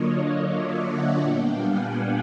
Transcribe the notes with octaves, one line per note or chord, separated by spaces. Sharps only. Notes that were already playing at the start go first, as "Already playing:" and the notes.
Already playing: D3 F#3 A#3 D4 F4 C#5 D#5
D5 E5
E5 F#5
A#2 G3 B3 D4 F5 G5
F#5 G#5